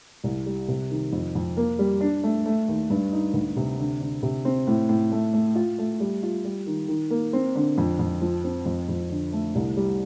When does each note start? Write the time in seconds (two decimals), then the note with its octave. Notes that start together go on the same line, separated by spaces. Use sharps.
0.24 C2
0.46 G3
0.68 C3
0.91 D#3
1.13 F2
1.35 F2
1.57 A#3
1.79 G3
2.01 D4
2.23 A3
2.46 A3
2.68 D#2
2.90 G2
3.12 D#4
3.34 D2
3.56 C3
3.79 D3
4.01 D3
4.23 C3
4.45 C4
4.67 A2
4.89 A2
5.12 A3
5.34 A3
5.55 F4
5.78 A3
6.00 G3
6.23 F4
6.45 G3
6.67 D#3
6.88 D#3
7.10 A#3
7.33 C4
7.55 D3
7.78 F2
7.99 F2
8.22 F3
8.44 C4
8.66 F2
8.89 F2
9.10 D3
9.33 A3
9.55 C2
9.77 G3